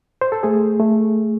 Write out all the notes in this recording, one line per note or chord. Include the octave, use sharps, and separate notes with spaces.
C5
A4
A3 G#4
A3